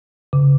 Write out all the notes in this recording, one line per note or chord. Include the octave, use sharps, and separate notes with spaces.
C#3